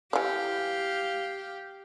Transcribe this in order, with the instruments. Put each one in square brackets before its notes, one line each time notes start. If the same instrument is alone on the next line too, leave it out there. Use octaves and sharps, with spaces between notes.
[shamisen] E3 D5 [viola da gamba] G4 [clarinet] F5